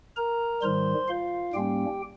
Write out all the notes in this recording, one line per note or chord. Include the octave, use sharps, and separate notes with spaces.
A#4 A#5
G#2 D#3 G3 C5 C6
F4 F5
G#2 G3 A#3 C#4 G4 G5